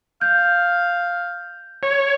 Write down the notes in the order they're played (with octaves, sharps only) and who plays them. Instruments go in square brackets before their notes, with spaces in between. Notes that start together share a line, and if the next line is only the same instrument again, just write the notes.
[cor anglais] F5 [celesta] G6
[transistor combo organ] C#5